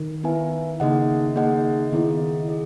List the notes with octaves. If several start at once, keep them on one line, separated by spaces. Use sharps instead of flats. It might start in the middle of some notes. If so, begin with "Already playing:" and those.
Already playing: D#3
B3 E4 B4 E5 G#5
C#3 A#3 D#4 G#4 D#5 F#5
A#3 D#4 G#4 D#5 F#5
D#3 B3 E4 G#4 D#5
G#4 D#5